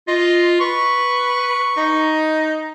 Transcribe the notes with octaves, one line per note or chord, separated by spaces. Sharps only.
F4 D#5
B4 C#6
D#4